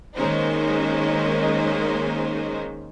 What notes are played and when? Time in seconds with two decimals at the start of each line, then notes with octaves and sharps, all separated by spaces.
0.17 D#3 G#3 A#3 C#4 D#4 C5